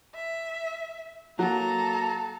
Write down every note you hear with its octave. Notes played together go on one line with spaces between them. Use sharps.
E5
F#3 A#3 A4 A#5